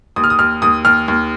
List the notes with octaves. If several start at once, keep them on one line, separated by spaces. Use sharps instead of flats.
D#2 D#6
F6
D#6
D#2 F6
D#2 D#6
D#2 F6
D#2